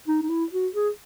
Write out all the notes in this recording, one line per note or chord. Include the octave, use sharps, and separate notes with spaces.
D#4
D#4
E4
F#4
G#4